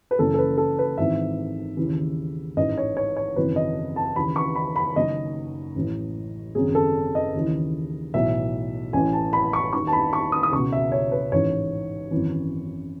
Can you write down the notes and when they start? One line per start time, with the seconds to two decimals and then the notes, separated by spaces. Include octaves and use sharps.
0.11 B4
0.19 F#1 F#2 E3 A4
0.34 A4
0.38 B4
0.58 A4
0.79 B4
0.98 G#1 G#2 E3 E5
1.77 D#2 C#3 E3
2.56 A1 G#2 E3 D#5
2.77 C#5
2.97 C#5
3.16 C#5
3.36 G#1 F#2 C#3 E3 B4
3.56 D#5
3.96 A5
4.16 D#2 C#3 E3 B5
4.36 C#6
4.55 B5
4.76 B5
4.96 F#1 F#2 D#3 D#5
5.75 A1 A2 E3
6.55 G#1 F#2 C#3 G#4
6.75 A4
7.15 D#5
7.34 D#2 C#3 E3
8.14 B1 A2 E3 E5
8.93 A1 A2 E3 G#5
9.13 A5
9.33 B5
9.53 C#6
9.73 D#2 D#3 C#6
9.87 A5
9.93 B5
10.13 C#6
10.32 D#6
10.43 D#6
10.52 C#2 B2 C#6
10.72 E5
10.92 C#5
11.12 B4
11.32 A1 G#2 E3 C#5
12.11 G#1 F#2 E3